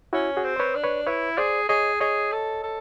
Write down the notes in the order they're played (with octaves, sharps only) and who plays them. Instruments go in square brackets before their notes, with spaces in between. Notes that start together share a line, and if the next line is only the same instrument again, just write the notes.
[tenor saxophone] C#4 [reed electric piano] E4 F#4
[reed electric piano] F#4 G#4
[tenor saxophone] C4
[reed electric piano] C5
B4 C#5
[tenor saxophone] D4
[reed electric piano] B4 C#5
[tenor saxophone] E4 [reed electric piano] B4 C#5
[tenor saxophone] G#4 [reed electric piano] C5 D5
[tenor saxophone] G#4 [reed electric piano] C#5 D#5
[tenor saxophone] G#4 [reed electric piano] C#5 D#5
[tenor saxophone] A4
A4